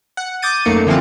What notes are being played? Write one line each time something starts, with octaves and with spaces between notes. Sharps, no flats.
F#5
D6 D#6 G6 A6 D#7
F#2 A3 A#3 D#4 C#7
D3 E3 F3 C4 F4